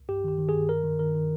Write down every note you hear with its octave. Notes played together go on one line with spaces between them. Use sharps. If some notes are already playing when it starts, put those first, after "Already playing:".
Already playing: C2
G2 G4
D#3 G4
D#3
G#4
G2
D#3 A#4
D#3
D#3 A#4
D#3